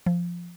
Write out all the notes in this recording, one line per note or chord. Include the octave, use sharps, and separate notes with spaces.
F3